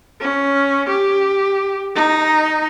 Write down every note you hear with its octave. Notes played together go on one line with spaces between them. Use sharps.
C#4
G4
D#4